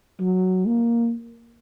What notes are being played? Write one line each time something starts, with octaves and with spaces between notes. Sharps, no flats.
F#3
A#3